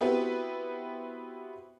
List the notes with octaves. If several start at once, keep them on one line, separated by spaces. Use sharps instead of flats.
B3 C4 E4 F#4 G4 B4